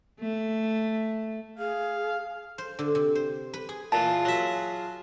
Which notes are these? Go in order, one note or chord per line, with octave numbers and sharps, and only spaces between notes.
A3
G#4 F5
C5
D3
C3
C5
B4
G#4
A#2 E3 F4 G#4 F5 A5
F#3 E5